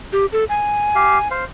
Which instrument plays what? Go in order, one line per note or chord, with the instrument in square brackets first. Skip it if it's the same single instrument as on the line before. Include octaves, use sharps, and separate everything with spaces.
[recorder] G4
A4
G#5
[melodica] G4 F5
C5 F5